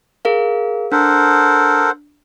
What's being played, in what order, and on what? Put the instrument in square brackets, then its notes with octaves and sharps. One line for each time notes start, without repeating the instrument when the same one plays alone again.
[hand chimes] G#4 A#4 F5
[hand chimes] D4 [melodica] A4 A#4 [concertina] C5 F#5